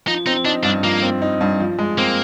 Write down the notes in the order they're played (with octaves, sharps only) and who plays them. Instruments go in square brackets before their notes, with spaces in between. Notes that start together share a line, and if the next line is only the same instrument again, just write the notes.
[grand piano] F3 [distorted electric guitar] D#4
[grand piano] C4 [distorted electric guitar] D#4
[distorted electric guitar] D4 [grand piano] D#4
[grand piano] G2 [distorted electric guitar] D4
[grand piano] F3 [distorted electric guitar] A#3
[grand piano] C4
D#4
G2
F3
G#3
[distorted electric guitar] A#3 [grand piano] C4